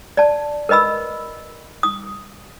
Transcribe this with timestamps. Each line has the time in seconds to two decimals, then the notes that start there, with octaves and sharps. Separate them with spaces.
0.17 D5 A5
0.69 A#4 B4 D#5 B5 E6
1.83 D#6